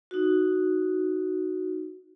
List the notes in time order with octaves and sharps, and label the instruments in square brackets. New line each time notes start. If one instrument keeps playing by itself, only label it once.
[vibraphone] D#4 F#4